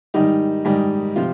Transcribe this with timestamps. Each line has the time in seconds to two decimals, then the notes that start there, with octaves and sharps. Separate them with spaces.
0.14 G#2 D#3 G3 D#4
0.65 G#2 D#3 G3
1.16 C3 F3 F4